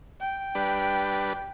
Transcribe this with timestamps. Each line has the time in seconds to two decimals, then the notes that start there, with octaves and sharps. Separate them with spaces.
0.21 G5
0.55 G3 D4 B4